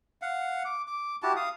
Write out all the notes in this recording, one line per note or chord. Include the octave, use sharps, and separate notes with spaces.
F5 F#5
D6
D6
E4 F#4 G4 A5
F5 D#6